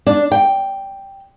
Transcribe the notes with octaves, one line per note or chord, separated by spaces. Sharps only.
D4
G5